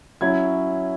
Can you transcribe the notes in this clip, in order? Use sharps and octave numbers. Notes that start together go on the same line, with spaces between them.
F#3 C#4 E4 G#6